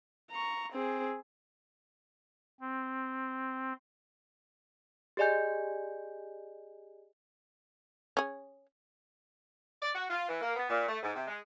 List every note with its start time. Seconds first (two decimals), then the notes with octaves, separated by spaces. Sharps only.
0.31 A#5 C#6
0.73 C4 G#4
2.61 C4
5.17 G4 G#4 D5 D#5 G#5 G6
8.17 C#4 G#4
9.82 D5
9.94 F#4
10.09 F4
10.28 E3
10.41 A#3
10.56 B3
10.69 A#2
10.88 A3
11.02 G#2
11.14 C3
11.28 G#3